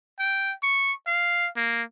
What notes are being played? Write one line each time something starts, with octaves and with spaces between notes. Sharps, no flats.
G5
C#6
F5
A#3